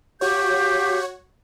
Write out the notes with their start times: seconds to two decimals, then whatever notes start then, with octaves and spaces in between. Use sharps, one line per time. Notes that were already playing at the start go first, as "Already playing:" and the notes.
0.21 F#4 G4 C#5 F5 G6